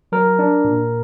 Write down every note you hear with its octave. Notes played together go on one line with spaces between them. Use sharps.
F#3 A#4
D4
A#2